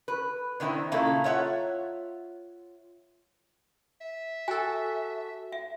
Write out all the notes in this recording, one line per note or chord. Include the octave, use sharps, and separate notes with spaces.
B4
D3 D#3 C4 E4
A#2 C#3 A3 A#3 E4
F4 C#5 E5 F#5
E5
F#4 A4 G#5
E5